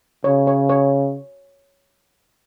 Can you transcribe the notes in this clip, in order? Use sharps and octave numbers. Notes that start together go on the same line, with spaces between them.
C#3 C#5
C#5
C#5